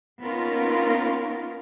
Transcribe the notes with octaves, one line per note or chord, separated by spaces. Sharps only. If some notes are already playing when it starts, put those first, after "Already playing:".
A#3 B3 C#4 D#4 F4 A#4